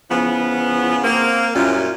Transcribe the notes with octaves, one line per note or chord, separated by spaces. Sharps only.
C#3 E3 F3 B3
A#3 C4
F#2 A#2 G3 C#4 E4 F4